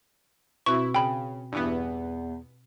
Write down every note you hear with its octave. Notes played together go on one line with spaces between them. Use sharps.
B2 C4 E4 F#4 C#6
C#3 G5 B5
E2 G2 E3 B3